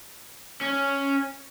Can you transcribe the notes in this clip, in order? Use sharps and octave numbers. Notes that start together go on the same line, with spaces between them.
C#4